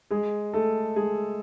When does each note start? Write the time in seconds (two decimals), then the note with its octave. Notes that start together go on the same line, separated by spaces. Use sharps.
0.11 G#3 G#4
0.54 A3 A4
0.96 G#3 G#4